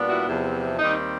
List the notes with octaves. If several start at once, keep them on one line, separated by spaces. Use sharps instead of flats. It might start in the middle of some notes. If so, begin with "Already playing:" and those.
Already playing: A#2 G3 B3 D4
E4 F#4
E2 C3 F3
D#2 D#3 G3 C4 D#4